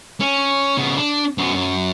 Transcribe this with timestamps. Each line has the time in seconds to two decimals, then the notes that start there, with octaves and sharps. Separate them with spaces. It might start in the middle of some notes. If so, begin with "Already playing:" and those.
0.20 C#4
0.77 C#3 B3
0.96 D4
1.38 F#2 B3
1.54 F#2